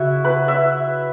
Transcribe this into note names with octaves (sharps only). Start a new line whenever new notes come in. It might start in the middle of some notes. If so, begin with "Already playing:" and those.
Already playing: C#3 E4 F#4 E5
B4
E5